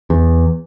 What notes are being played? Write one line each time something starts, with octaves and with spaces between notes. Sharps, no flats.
E2